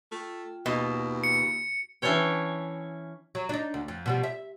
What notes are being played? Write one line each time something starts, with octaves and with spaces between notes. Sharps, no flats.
A3 F4 G5
D#2 B2
C#7
E3 C#4 D4 E4 C#5 G5
F#3
D4 D#4
D2
F2
B2 F3 G3
E5